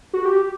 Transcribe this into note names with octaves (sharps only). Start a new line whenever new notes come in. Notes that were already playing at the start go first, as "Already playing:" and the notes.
F#4
G4